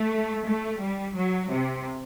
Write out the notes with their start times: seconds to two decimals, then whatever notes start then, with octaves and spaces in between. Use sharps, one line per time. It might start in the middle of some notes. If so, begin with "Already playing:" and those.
Already playing: A3
0.46 A3
0.81 G3
1.16 F#3
1.50 C3